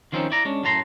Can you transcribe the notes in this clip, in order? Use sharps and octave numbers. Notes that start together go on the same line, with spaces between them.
D#3 F3 C4 C#4 D#4
E4 D5 A#5
G#3 C#4 D4
F#2 A2 A5 A#5 C6